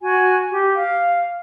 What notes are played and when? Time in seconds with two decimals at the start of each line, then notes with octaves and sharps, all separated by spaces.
0.01 F#4 G#5
0.50 G4
0.76 F5